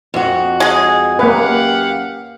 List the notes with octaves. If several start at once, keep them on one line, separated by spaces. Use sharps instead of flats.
F2 F#4
G#3 G#4
F#2 A#3 G4 B4 F5 F#5